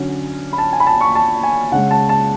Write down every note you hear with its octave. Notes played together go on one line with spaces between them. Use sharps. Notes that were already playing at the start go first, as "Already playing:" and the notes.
Already playing: D3 F#3 C#4
B5
A5
G#5
B5
A5
C#6
A5
G#5
C#3 G#3 C#4 F#5
A5
A5